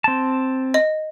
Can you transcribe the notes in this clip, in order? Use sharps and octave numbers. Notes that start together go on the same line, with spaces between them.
C4 A5
D#5